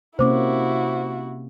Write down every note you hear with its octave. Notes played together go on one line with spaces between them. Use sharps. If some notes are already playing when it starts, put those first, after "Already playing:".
C3 A#3 C#4 E4 F#4 C5 D6